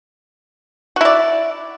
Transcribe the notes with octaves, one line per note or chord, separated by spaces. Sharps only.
E4 F#4 D5